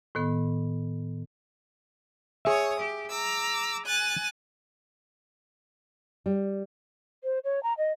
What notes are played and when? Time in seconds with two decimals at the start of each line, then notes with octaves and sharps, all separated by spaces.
0.15 A2 D#3 B3
2.45 G#4 C#5 E5 D#6
2.79 G4
3.08 A#5 D6 E6
3.86 G#5 F#6 A6
6.26 G3
7.24 C5
7.44 C#5
7.63 A#5
7.78 D#5